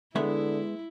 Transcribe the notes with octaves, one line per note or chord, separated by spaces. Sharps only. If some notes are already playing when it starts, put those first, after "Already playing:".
D3 G#3 B3 E4 E5